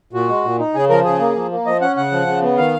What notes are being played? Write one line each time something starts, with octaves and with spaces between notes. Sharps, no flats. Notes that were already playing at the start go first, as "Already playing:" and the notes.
A#2 F#4
G#3
A#2
D#4
C#3 G#4
F3 A#4
C#3 G#4
A#3
F3
A#3
F3 D#5
C#4 F#5
C#3 F#5
F3
C#3
B3
D#3 F5